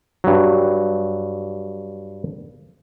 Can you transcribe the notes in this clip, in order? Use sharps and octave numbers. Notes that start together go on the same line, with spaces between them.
G2 F#3